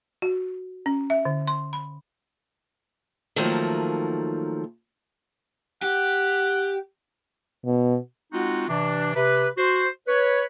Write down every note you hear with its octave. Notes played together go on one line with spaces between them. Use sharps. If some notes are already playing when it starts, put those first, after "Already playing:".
F#4
C#4
E5
D3
C6
B5
D#3 F3 F#3 A3 A#3
G4 F#5
B2
G#3 C4 D#4 F4 F#4
C3 E3 D4
C3 B4
F#4 C5
B4 C#5